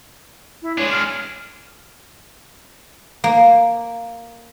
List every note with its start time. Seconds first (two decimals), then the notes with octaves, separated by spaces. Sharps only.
0.62 E4
0.78 G#3 D4 C#5
0.91 F6
3.24 A#3